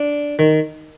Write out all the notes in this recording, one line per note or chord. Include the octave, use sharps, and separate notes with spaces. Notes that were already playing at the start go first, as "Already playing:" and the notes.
Already playing: D4
D#3